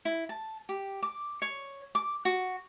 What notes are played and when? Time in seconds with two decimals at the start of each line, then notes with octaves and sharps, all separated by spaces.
0.05 E4
0.29 A5
0.69 G4
1.03 D6
1.42 C#5
1.95 D6
2.25 F#4